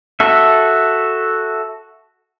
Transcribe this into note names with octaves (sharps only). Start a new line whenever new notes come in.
F#4 A4 E5